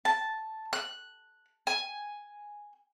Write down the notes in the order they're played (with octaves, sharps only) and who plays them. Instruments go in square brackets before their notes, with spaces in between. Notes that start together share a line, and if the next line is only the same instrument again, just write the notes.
[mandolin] A5
F#6
G#5